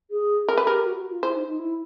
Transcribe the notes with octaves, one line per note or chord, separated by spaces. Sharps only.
G#4
A4 A#4
B4
G4 A#4
F#4
F#4
F4
E4 C5
D#4
D#4
E4